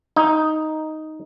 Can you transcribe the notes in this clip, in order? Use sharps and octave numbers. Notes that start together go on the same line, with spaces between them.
D#4